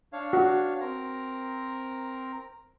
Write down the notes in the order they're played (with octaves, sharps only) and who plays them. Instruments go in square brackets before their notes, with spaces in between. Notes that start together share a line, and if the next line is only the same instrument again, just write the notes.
[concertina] D4 C#5 F5
[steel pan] F#4
[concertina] C4 A#4 A#5